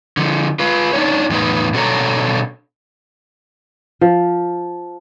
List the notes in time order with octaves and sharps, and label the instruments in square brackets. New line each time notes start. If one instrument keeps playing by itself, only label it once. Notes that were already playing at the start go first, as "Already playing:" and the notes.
[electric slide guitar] D3 F3
F4 B4
D4 D#4 C#5
E2 A2 G#3 D#4 B4
B2 D4 A4 B4 C#5 A#5
[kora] F3